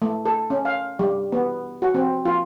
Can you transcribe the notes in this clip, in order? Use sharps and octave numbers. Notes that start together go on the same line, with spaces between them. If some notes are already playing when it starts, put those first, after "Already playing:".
A3
A4
C#4
F5
G3
B3
F#4
C4
F4